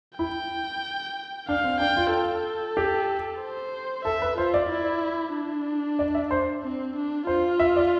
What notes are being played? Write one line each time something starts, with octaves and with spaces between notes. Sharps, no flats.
E4 G5
D4 F5
C4
D4 G5
F4
A4
G4
C5
A4 E5
B4
F4 C5
D5
E4
D4
D5
E5
C5
C4
D4
F4 C5
E5
D5